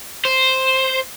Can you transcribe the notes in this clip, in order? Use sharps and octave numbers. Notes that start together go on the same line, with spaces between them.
C5